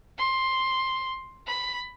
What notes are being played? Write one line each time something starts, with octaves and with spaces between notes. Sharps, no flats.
C6
B5